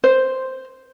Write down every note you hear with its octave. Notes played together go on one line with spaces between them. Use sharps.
C5